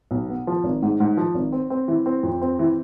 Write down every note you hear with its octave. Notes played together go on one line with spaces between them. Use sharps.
B1
B3
F3
G#1
G#2
G#2
F3
G#1
C4
C4
E3
C4
F2
C4
E3